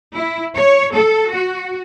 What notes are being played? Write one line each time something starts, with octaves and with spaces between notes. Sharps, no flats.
E4
C#5
A4
F#4